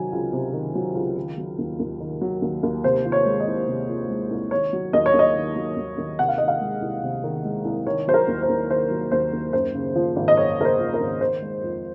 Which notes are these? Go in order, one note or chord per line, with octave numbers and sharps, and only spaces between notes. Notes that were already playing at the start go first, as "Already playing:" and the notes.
Already playing: C3 D#3 F#3 G#5
C#2
C3
D#3
F#3
C#2
D#3
F#3
D#2
D#2
D#3
F#3
D#2
D#2
C3 C5
F3
C#5
G#3
D#5
C2
C3
F3
G#3
C2
D#3 C#5
F#3
D#2 D#5
C#5
D#2
D#5
D#3
F#3
D#2
D#2
C3 F#5
F5
D#3 D#5
F5
G#3
C2
C3
D#3
G#3
C2
D#3 C#5
F#3 C5
A#4
D#2
C5
D#2
D#3 C5
F#3
D#2 C5
D#2
F#2 C5
C#3
F3
G#1
D#5
F#2 C#5
C#3 A#4
C5
F3
A#4
G#1
D#3 C5
G#3
F2